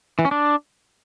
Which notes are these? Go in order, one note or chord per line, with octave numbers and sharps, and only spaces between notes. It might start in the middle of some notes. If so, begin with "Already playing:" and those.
E3
C#4
D4